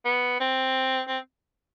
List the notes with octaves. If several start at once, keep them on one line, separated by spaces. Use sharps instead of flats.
B3
C4
C4